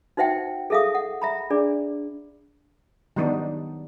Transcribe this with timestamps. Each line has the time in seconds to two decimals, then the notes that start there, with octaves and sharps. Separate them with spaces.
0.17 D#4 F#4 C5 E5 F#5 G5
0.70 G#4 A4 E5 F5 D#6
0.95 F#5
1.22 E5 A#5 B5
1.50 D4 G#4 D5
3.16 D#3 F#3 G3 B3 D4 D#4